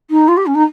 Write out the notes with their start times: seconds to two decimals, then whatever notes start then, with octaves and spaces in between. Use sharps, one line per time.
0.10 D#4
0.28 F4
0.37 G4
0.46 C#4
0.55 D#4